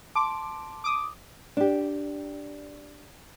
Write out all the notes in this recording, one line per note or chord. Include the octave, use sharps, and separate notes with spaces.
A5 C6 D6
D6 D#6
D4 G4